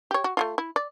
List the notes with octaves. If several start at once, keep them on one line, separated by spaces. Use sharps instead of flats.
G4 C#5
F#4
A3 A#3 F4
E4
D5